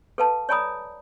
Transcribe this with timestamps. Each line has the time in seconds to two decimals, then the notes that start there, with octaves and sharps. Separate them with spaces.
0.18 A4 B4 F5 A5
0.49 C#5 D5 G#5 A#5 B5 D#6